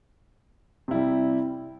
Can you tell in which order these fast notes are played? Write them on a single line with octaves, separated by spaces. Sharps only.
C3 E4 G3